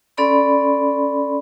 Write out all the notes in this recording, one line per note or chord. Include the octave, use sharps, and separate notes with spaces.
C#4 A4 D5 B5 C6